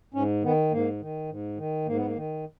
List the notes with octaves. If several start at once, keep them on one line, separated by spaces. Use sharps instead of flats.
G#2 C#4
D#3 B3
G#2 A#3
D#3
G#2
D#3
G#2 A#3
B3
A#3
D#3